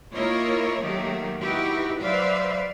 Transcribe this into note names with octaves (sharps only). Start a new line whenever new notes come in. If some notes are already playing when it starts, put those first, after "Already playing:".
A#3 E4 F4 A#4 C#5 D#5
D#3 F#3 A3 A#3 G4
D#4 E4 F#4 G4 B4
F#3 B4 C5 D5 E5 F5